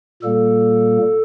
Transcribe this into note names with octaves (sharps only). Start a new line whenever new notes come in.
A#2 G3 A#3 A4